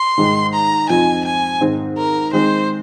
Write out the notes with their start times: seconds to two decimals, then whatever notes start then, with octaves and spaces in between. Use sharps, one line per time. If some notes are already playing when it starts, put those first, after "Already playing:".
Already playing: C6
0.17 G#2 D#3 G#3 D#4
0.54 A#5
0.90 F2 F3 C4 D#4 G#5
1.25 G#5
1.61 G#2 D#3 C4
1.97 A#4
2.33 D#3 G#3 C4 C5